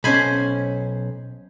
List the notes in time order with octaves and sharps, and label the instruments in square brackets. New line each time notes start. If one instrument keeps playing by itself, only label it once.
[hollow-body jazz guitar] B1 C#4 [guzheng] C5 G#5 B5